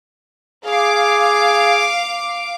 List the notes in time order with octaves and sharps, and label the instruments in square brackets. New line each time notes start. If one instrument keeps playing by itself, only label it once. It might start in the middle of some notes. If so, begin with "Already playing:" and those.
[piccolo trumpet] G#4 [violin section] F5 D6